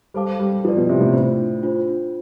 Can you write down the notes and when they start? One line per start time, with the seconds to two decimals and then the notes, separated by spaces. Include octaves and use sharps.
0.14 G3 A4 C5 F5 A5 D6
0.39 G3
0.65 F3 E4 B4 D5
0.77 B2
0.89 C3
1.01 A2
1.13 D4 F4 C5
1.63 D4 F4 C5